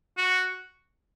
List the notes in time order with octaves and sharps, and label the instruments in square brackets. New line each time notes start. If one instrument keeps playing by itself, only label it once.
[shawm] F#4